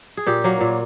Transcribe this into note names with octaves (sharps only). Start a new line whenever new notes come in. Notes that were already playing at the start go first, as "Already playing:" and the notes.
G#4
A#2 G4
F#3 A#3
A#2